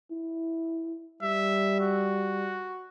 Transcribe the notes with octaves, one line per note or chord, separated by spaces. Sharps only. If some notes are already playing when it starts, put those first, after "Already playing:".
E4
G3 E5
F#4